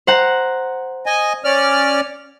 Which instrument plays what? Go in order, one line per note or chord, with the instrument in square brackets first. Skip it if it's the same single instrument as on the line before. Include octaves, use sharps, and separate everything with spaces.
[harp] C5 F#5 A#5
[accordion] D#5 G#5
C#4 D5 F6